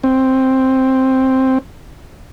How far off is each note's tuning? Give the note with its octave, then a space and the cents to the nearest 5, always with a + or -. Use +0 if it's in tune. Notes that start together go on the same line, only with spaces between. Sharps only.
C4 +5